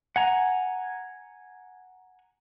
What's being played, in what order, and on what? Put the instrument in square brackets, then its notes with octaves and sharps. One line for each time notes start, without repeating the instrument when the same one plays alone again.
[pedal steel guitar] F#5 G#5 A#5